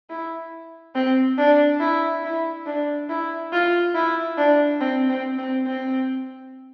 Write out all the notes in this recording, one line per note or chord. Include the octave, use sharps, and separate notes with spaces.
E4
C4
D4
E4
E4
D4
E4
F4
E4
D4
C4
C4
C4
C4